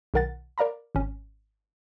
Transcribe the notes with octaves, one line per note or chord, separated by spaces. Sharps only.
B1 D#3 A#4 F#5 A6
A#4 D5 F5 A#5 B5
G#1 C#4